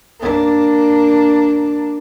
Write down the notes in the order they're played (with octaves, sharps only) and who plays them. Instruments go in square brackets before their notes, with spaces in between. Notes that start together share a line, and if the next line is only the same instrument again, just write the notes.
[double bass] A#3 D4